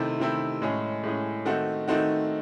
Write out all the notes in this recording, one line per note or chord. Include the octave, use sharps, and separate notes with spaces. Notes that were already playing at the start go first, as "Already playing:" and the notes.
Already playing: C3 D#3 A3 C4 E4
C3 D#3 A3 C4 E4
A2 G#3 C#4 G#4
A2 G#3 C#4 G#4
D#3 A3 C4 D#4 F#4
D#3 A3 C4 D#4 F#4